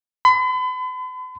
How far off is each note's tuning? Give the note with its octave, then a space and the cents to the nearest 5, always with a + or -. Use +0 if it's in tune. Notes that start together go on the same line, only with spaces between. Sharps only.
B5 +45